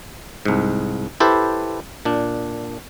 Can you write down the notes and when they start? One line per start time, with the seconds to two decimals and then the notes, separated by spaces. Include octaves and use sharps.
0.45 C2 G#2
1.20 E4 G4 A4 B4 C5
2.05 A#2 D4